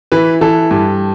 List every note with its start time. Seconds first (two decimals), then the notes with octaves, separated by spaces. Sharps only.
0.12 E3 B4
0.41 E3 A4
0.71 G2